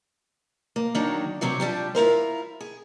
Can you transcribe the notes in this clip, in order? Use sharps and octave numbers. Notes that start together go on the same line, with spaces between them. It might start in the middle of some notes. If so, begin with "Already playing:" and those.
A#3
D#3 F#3 A#3 D4 D#4
C3 F#3 G3 F#4
F3 G3 D4 G4
E4 F4 A#4 C5
G#4